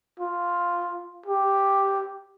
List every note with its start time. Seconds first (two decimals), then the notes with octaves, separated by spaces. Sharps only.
0.20 F4
1.26 G4